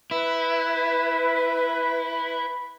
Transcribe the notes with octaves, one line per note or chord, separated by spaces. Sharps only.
E4 B4 B5